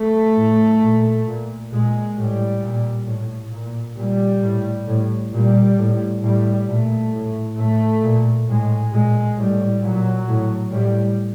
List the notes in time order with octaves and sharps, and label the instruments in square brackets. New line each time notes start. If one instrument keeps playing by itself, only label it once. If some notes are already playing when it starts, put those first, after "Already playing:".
Already playing: [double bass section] A3
A2
A#2
A#2
A#2 G#3
A2 G3
A#2
A2
A#2
A#2 G3
A2
A2
A#2 G3
A2
A2 G3
A#2 A3
A2
A2 A3
A#2
A2 G#3
A#2 G#3
A2 G3
A#2 F#3
A2
A2 G3